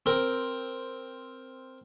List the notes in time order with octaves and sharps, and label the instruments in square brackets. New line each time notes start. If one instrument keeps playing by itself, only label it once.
[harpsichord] C4 A#4